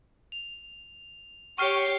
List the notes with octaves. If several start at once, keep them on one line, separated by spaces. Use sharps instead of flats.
F7
G4 C#5 C#6 F6 C7